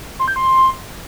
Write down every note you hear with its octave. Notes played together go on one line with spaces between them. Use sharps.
C6
G6
C6